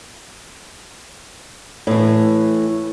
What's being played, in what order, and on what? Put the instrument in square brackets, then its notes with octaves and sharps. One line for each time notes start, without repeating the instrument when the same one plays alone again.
[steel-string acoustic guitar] A2 E3